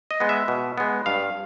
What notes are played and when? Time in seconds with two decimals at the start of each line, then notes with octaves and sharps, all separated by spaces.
0.11 D#5
0.20 G#3 B3
0.29 E5
0.48 B2
0.78 G#3 B3
1.06 G2 F5